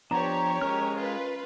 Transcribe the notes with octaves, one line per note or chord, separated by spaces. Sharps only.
F3 B3 D4 G4 C#5 A#5
G#3 C#4 A#4 F6
F4 B4